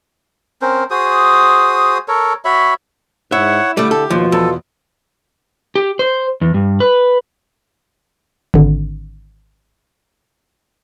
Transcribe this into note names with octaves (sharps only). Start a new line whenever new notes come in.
C4 C#4 A#4 C5
F#4 G#4 C5 D#6
A4 A#4 C#5
F#4 C#5 E5 B5
G#2 E4 C#5 E5 F#5
D3 G3 A3 D6
G4 A4
D#2 B2 F3 F4
E2 A4
G4
C5
E2
G2
B4
G#1 D3